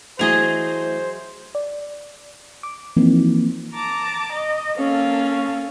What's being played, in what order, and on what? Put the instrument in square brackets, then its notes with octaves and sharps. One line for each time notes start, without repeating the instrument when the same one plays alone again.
[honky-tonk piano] E3 A3 F7 [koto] F#3 G#4 D#5 [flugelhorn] C5
[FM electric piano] D5
D6
E3 F3 A#3 C4 D#4
[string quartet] A5 A#5 D6
D#5
[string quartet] A#3 A4 F5 [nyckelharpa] C#4